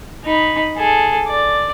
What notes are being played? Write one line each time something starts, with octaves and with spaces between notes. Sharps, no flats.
D#4 B5
G#4 A4
D5